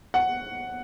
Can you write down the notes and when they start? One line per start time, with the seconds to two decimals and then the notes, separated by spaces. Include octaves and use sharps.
0.14 F#5